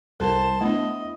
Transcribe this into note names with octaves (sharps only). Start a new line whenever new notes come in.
C2 A4 A#4 C5 A5
A3 B3 D4 E4 D#5